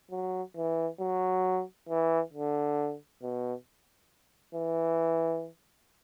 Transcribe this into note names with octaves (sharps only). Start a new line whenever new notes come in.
F#3
E3
F#3
E3
D3
B2
E3